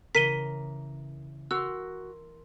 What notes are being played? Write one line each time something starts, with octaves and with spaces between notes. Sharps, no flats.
C#3 E3 A#4 B6 D#7 G7
F#4 A#4 C6 E6